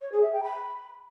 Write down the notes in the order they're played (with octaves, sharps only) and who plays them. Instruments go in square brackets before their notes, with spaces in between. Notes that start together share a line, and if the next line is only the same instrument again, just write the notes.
[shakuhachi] C#5
G#4
E5
G5
B5